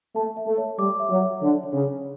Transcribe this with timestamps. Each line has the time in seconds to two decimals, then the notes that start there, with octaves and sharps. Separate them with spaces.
0.16 A3 A5
0.37 E5
0.47 A3
0.58 C#5
0.79 G3 D6
1.00 E5
1.10 F#3
1.21 C#5
1.42 D3 C#5
1.63 C#5
1.73 C#3
1.84 C#5